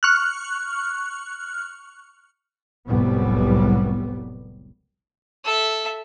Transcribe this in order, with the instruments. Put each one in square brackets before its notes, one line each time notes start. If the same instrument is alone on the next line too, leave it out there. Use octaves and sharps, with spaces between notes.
[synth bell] C#6 F6 F#6
[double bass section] F1 C2 A2 F#3 G3 B3
[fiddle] A4 E5